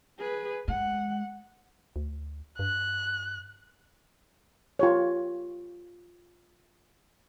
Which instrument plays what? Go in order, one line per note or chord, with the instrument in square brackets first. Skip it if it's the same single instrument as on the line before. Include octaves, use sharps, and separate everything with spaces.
[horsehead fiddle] G#4 B4
[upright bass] G#3 [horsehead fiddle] F#5
[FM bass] D2
[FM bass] G2 [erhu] F#6
[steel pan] F4 G4 C#5